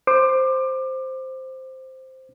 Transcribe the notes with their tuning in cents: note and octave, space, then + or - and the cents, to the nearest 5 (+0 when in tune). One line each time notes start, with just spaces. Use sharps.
C5 +0 D6 +25